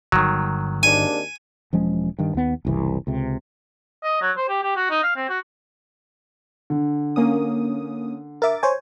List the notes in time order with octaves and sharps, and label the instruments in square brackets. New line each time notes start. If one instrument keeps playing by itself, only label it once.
[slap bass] G1 [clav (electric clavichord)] D#3 F#3
[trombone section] G#1 D#2 D4 [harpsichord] G#5
[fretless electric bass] E1 F3 G#3 C#4
G2 D#3
D#2 B3
F#1 C2 E3
C#2 C3
[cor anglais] D#5
F#3
C5
G4
G4
F#4
D#4
F5
C4
F#4
[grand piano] D3
[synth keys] A#3 C#4 D#6
[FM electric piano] A#4 E5 [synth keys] D6 A6
[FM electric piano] C5 C#5 G#5